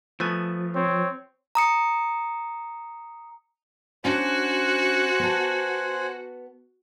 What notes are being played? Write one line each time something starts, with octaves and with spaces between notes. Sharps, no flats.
F3 A3 B3 G#5
C4 C#5
A#5 D#6 C#7
C#4 D4 F#4 C5 F#5 G#5
B3 A5